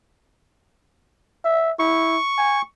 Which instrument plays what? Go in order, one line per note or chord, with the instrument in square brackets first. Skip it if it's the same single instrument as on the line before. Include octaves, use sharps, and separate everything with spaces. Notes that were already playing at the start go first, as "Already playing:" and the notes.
[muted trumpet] E5
[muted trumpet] E4 [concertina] C#6
[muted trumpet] G#5